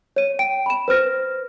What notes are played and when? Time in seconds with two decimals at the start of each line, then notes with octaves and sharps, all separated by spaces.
0.16 C#5 D#7
0.39 G5 D7
0.66 B5 E7
0.88 B4 C5 F6 A#6